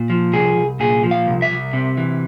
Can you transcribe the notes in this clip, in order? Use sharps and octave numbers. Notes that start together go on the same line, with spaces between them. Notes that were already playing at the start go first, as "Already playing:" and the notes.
Already playing: A#2
F3
C2 G#4
C2
A#2 G#4
F3
F5
C2
E5
C2
C3
E3